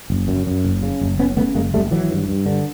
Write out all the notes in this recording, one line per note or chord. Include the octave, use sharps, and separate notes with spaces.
F#1
F#2
F#2
F#1
C#3
F#1
F#1 B3 C#4
C#3 A3 B3
F#1 G#3 A#3
F#1 G3 A3
G#1 E3 F#3
G2
G2
D3